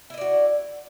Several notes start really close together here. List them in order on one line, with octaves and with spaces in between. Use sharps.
E4 D#5 D5 F#4